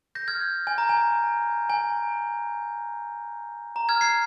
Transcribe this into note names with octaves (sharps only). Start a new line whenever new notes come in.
G6 A#6
F6 G#6
G6
G#5
A#5
G#5
G#5
A#5
F6 G#6
G#6 C7